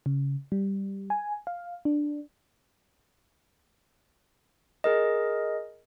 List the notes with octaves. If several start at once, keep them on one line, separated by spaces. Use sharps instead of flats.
C#3
G3
G#5
F5
D4
G#4 A#4 D#5